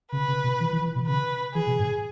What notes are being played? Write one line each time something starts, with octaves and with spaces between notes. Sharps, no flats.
C#3 B4
C#3
B2
E3
E3
E3
B2
C#3 B4
E3 G#4
B2
G#2